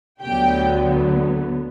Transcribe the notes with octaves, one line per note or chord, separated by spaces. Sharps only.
D2 D3 F#3 B3 G4 G5